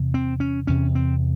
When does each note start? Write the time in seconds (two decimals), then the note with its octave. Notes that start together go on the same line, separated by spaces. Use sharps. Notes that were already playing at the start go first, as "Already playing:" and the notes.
Already playing: E2 C3
0.14 C4
0.40 C#4
0.67 E2 C3 C#4
0.95 C4